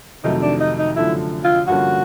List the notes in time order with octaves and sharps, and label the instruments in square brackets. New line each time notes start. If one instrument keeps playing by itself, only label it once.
[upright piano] F2 C3 D#3 F#3 A3 [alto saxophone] D#4
[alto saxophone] D4
D#4
D#4
[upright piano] F#2 D3 F3 A3 [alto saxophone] E4
[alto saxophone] F4
[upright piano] G2 D3 F3 A#3 C#4 [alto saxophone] F#4